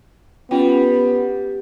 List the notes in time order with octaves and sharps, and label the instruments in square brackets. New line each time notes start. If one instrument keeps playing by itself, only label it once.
[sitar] G3 [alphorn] B3 [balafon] C#4 F4 G5